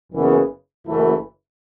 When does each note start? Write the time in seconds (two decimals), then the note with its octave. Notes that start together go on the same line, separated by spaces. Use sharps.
0.11 F#1 F#2 C#3 E3 B3
0.86 F#1 F#2 E3 A3 E4